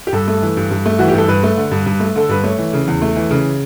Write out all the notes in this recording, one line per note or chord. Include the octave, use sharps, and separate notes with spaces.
G4
G2 A4
A3
E3
G2
G2
A3
E3 F#4
G4
G2 A4
G2 B4
A3
D3
G2
G2
A3
D3 A4
G2 B4
A3 C#5
E3
C#3
E2
A3
E3
C#3